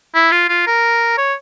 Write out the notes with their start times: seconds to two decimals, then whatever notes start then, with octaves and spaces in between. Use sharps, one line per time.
0.15 E4
0.31 F4
0.49 F4
0.67 A#4
1.18 C#5